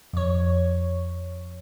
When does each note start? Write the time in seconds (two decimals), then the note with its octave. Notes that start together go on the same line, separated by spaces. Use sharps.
0.13 F2 C#5